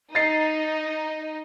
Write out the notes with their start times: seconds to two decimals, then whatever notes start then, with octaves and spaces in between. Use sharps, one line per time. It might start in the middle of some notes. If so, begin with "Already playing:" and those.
0.15 D#4 D#5 A6 C7